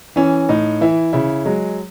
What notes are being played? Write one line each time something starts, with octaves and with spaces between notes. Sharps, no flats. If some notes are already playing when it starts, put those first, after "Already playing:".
E3 C#4
A2 D#4
E3 E4
C#3 E4
F#3 G#3